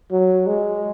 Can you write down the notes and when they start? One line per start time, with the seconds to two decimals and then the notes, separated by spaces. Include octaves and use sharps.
0.12 F#3
0.47 G#3